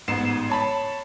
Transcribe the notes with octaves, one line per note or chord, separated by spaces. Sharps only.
A1 G#2 B3 C7 E7
C#5 A5 B5